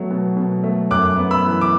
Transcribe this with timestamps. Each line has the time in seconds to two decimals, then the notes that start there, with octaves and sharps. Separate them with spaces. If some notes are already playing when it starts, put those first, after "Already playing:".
Already playing: B2 F#3 A3
0.11 B2
0.37 B2
0.64 A3
0.91 F#2 D6 F#6
1.17 B3
1.31 B5 E6
1.44 E3
1.61 D6